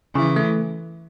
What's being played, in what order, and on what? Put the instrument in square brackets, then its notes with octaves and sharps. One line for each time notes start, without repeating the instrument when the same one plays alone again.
[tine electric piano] C#3 [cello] E3
[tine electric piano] A3